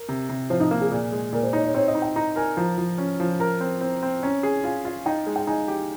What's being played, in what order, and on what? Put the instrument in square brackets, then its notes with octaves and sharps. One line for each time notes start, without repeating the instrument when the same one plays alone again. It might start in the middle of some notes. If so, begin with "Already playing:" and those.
Already playing: [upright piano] A#4
[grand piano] C3
C3
[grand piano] F3 [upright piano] C5
[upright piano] D#4
[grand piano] A#3
[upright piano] G#4
[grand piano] A#2
G#3
[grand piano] A#2 [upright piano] A#4
[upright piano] C5
[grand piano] D#4 [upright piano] C#5
[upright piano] C#5
[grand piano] C4 [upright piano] C#5
[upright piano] D#5
[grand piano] D#4
[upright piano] G5
[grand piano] D#4 [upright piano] A#5
[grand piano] A#4 [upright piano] G#5
[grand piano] F3 [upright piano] A#5
[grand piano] F3
C#4
F3
[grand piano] A#4 [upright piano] A#5
[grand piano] C4
C4
C4
[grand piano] C#4 [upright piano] A#5
[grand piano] G#4
[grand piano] F4 [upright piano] G#5
[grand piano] F4 [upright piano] F5
[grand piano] D#4 [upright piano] G5
[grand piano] G#3
[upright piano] G5
[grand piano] D#4 [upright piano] G#5
[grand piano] G4